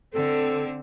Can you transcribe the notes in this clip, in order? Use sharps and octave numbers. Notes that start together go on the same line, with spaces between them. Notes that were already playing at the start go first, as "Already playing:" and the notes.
D3 C4 A4